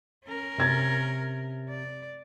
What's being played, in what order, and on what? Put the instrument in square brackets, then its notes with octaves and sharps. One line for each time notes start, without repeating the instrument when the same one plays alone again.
[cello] C#4 A#4
[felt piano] C3 G#6 A6
[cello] D5